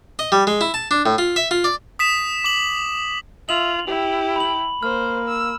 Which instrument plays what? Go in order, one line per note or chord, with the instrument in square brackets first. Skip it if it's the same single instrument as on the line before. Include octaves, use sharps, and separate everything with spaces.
[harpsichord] D#5
G3
G#3
E4
A5
D4
A2
F4
E5
F4
D5
[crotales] D#6 B6 E7
D6 F#7
[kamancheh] F4 [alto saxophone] E5 [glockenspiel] F7 F#7
[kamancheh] E4 G5 [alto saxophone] G4
[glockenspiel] B5 F#7
[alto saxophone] A#3 [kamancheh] C5 [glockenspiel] F6
[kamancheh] E6